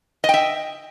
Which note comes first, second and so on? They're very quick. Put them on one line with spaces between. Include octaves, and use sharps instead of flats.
D#5 G5 E5